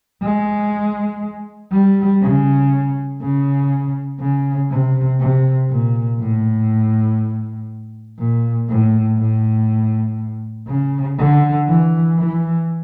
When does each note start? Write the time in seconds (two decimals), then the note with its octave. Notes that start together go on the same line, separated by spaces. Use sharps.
0.22 G#3
1.72 G3
2.22 C#3
3.22 C#3
4.20 C#3
4.71 C3
5.20 C3
5.70 A#2
6.20 A2
8.19 A#2
8.69 A2
9.19 A2
10.67 C#3
11.18 D3
11.68 E3
12.18 E3